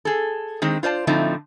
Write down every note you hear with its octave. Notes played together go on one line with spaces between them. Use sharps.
G#4 A4
D#3 G#3 C4
F4 C5 D5 A5
A2 D3 F3 A3 C4 D#4